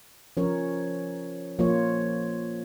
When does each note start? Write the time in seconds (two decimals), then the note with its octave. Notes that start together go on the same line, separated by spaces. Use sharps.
0.37 F3 C#4 A#4 C#5
1.59 F3 A#3 F4 C#5